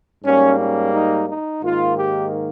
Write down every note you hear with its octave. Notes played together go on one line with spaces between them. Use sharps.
G#2 G3 A#3 C#4
C#4
D#4
D#4
G#2 D#3 A#3 F4
G4